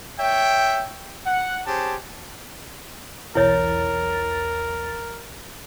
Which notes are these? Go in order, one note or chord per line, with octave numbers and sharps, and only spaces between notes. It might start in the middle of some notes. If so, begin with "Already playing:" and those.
C#5 E5 G5
F#5
C#4 G4 G#4 C5 A5
B1 E2 E4 A#4 C#5 A6